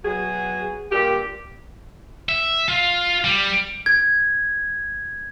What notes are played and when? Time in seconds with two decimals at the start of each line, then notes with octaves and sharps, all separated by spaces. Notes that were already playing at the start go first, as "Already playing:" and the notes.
0.04 B2 F#3 F#4 G#4
0.91 G2 A#2 G4
2.29 E5
2.68 F4
3.24 G3
3.86 G#6